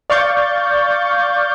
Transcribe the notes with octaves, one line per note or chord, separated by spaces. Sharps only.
D5 F5 C#6 G6 A6